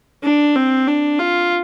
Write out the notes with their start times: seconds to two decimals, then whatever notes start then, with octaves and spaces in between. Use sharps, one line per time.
0.23 D4
0.55 C4
0.87 D4
1.19 F4